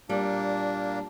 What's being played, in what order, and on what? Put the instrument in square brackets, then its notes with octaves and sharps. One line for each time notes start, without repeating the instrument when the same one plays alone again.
[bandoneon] A#2 A#3 D4 [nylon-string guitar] G3